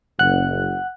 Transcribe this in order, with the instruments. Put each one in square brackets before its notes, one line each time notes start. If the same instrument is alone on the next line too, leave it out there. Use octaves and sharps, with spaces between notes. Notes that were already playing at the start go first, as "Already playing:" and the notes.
[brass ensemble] F#1 [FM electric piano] F#5 F#6